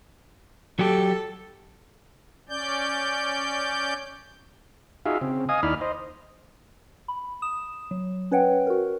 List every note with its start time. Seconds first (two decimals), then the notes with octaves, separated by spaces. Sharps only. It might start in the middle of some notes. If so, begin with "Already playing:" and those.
0.79 F#3 G4 A4
2.49 C#4 D5 G6
5.06 D#4 F4 F#4 G#4 E5 F5
5.21 C#3 C4
5.49 D#5 F5 G#5 D#6
5.63 D#2 D#4 E4 D5 B5 F6
5.81 C5 D#5
7.08 B5
7.42 D#6 E7
7.91 F#3
8.31 C#4 B4 C#5 F#5 G5
8.67 F#4 A#4